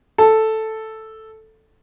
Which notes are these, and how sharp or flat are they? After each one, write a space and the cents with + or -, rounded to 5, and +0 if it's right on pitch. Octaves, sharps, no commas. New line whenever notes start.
A4 +0